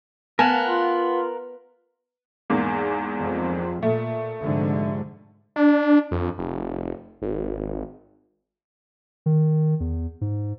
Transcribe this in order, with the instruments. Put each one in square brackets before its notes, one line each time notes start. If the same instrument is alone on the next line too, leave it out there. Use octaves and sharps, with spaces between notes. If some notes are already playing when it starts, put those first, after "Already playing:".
[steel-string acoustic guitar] B3 [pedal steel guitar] A#4 F5 F#5 [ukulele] G#5 A5
[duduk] F4
[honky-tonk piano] E2 G#2 A#3
[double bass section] F2
[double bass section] A#2 [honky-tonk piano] A3
[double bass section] F1 G#2 D3
[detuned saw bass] D4
F2
F1
G#1
[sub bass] D#3
E2
G#2